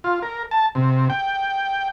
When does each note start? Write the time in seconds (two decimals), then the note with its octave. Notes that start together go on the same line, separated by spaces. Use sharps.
0.04 F4
0.23 A#4
0.51 A5
0.75 C3
1.10 G5